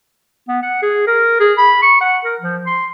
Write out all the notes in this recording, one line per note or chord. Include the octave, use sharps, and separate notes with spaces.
B3
F#5
G#4
A#4
G#4
B5
C#6
F#5
A#4
F3
C6